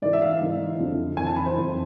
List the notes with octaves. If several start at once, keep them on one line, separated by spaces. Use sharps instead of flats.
G#2 E3 D5
E5
F5
G#2 E3
F2 D3 F3
F2 E3 G#5
A5
B5
C5
F2 E3